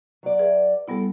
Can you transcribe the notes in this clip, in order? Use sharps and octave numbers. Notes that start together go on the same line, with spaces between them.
F#3 D5
G#4 B4 E5
G3 B3 E4 F#4 A4